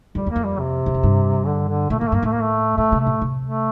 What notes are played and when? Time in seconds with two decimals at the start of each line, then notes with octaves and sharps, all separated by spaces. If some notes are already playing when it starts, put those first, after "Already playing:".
0.15 F2 G3
0.26 E2
0.31 A#3
0.36 F2
0.44 G3
0.59 C3
0.86 E2
0.94 F2
1.03 G2
1.46 D3
1.68 D3
1.90 A#2 A3
1.99 A2 A#3
2.08 A3
2.12 G2 A#3
2.23 A2 A3
2.33 A#3
2.42 A3
2.77 A2 A3
2.92 C3
3.00 A3
3.06 A2
3.21 C3
3.43 A3